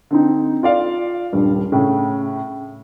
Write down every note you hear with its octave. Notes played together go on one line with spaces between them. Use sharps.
D3 C4 D#4
F4 D5 F5
D#1 G2
A2 C#3